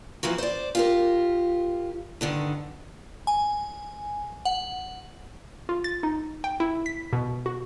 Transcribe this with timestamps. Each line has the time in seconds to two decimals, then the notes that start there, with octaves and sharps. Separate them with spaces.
0.23 E3 F3 A#3 F#4
0.38 C5 D5
0.75 F4 G4 A#4
2.21 G2 D3 D#3
3.27 G#5
4.45 F#5
5.69 F4
5.84 A6
6.03 D#4
6.44 G5
6.60 E4
6.86 B6
7.13 B2
7.46 F#4